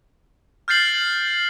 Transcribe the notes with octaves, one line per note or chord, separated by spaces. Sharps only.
F6 G6 A6 C7 F#7